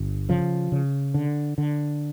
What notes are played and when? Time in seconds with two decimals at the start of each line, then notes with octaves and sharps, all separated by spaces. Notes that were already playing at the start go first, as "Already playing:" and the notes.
Already playing: G1
0.29 C#3 F3
0.72 C#3
1.14 D3
1.58 D3